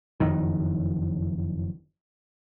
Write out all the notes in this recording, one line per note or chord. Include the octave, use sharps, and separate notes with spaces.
F#1 F2 D#3